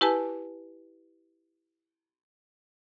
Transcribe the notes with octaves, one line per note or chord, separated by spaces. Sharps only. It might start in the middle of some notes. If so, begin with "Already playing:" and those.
E4 G4 B4 G#5 A5